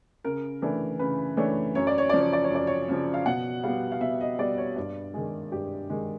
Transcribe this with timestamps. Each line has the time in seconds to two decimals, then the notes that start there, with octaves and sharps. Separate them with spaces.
0.25 C#3 A#4
0.62 E3 A3 D4 A#4
0.99 C#3 B4
1.37 E3 A3 D4 C#5
1.75 F#2 C#5
1.87 D5
1.98 C#5
2.09 C#3 F3 D5
2.21 C#5
2.33 D5
2.44 C#5
2.50 F#2 D5
2.67 C#5
2.88 C#3 F3
3.14 F5
3.26 B2 F#5
3.63 G3 B3 F5
3.92 F5
4.01 B2 E5
4.21 D#5
4.39 G3 B3 D5
4.58 C#5
4.76 G2 D5
5.14 D#3 G#3 G#4
5.52 G2 G4
5.90 D#3 G#3